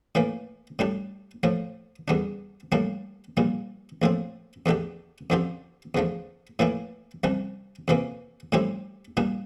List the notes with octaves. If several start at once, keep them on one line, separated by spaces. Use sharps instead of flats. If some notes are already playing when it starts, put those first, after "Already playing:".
A2 E3 A#3
A2 G3 D4 G4
A2 F3 A3
E2 D3 G3 D4
A2 G3 A#3 D4
A#1 A#2 G3
A#1 A2 F3 C4
E2 D3 A3 D4 G4
F2 D3 F3 C4 G4
E2 D3 F3 A3
A2 E3 A#3 E4
C2 C3 G3 D4
F2 C3 E3 A#3
A2 G3 C4 E4 G4
A#2 G3 D4